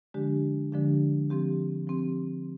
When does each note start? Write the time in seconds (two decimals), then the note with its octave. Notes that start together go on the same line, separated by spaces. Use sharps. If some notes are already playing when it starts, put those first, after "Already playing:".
0.14 D3 F3 G#3 D4 G4
0.72 D3 F3 G#3 D4 G4
1.30 F3 C4 G4
1.87 F3 C4 G4